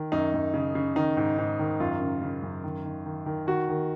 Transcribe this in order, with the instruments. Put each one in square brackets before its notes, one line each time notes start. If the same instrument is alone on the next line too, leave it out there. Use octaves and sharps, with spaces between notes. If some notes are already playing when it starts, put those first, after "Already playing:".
Already playing: [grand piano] D#3
F#2 D#4
F#2
C#3
C#3
D#3 D#4
G#2
G#2
D#3
F#2 F4
C#3
C#3
F#2
D#3
D#3
D#3
D#3
D#3 F#4
D#3